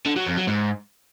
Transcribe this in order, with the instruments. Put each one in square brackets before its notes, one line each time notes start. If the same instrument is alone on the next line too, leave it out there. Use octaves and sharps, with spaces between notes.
[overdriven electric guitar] D3
F#3
F2
F#3
G#2